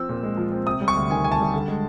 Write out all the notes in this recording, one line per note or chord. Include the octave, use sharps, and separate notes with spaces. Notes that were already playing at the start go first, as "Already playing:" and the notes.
Already playing: F3 C4 E6
A#2
G#3
F3
C4
C3 D#6
G3
C#6
D2
D#3 G#5
C3 G#5
A5
G3
D3
G#3